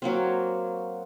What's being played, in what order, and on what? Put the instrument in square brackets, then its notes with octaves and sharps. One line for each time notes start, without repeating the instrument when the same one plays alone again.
[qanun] F#3 A#3 C4